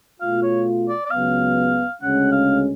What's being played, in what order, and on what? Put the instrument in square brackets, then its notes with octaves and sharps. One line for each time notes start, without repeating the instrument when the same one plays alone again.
[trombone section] B2 A3 F4 [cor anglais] F5
[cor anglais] C#5
D5
D5
[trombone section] C#2 C#3 F#3 B3 [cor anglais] F5
[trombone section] D2 C#3 G#3 C#4 [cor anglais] F#5
[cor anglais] F5